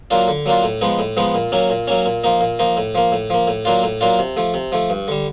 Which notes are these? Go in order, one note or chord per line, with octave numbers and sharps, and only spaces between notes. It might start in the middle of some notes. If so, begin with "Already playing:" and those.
F#3 A#3 D4 F4
D3
F#3 A#3 D4 F4
A2
F3 G#3 B3 D#4
A2
F3 G#3 B3 D#4
A#2
F#3 A#3 C#4
A#2
F#3 A#3 C#4
A#2
F3 A#3 D#4
A#2
F3 A#3 D#4
A2
F3 A#3
A2
F3 A#3
A2
F#3 A#3 D4 F4
A2
F#3 A#3 D4 F4
C3
F3 A3
C3
F3 A3
G2
D3 G3